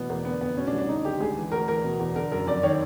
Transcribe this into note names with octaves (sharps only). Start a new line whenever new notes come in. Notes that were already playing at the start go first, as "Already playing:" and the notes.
Already playing: B2 E3 B3
E2 A#3
D3 B3
F2 B3
B2 C#4
D4
C2
D4
D3 D#4
D#2 G4
C#2 G#4
E3
D2 A#4
E3 A#4
B2
E2
D3 A#4
F#2 A#4
F2 D5
D#3 C#5